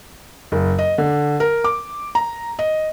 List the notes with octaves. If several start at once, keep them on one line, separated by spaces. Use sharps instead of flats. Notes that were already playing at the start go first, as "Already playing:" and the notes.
F#1
D#5
D3
A#4
D6
A#5
D#5